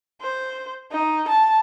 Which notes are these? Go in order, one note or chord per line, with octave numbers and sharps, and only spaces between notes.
C5
D#4
A5